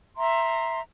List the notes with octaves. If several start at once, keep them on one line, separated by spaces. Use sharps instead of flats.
E5 A#5 C6